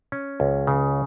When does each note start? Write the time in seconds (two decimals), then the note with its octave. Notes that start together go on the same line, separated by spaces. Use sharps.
0.12 C#4
0.40 C#2
0.67 C#3